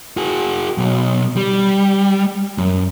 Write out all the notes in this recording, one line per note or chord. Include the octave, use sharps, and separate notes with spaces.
F#4 G#4
B1 B2
G3
F#2